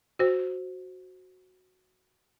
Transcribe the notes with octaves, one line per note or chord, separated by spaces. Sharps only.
F#4 C5